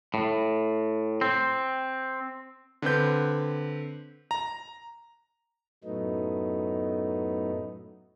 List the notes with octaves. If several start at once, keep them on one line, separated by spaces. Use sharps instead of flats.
A2
C4
D3 C4 B4 G6
A#5
F#2 A2 F#3 A3 B3 D#4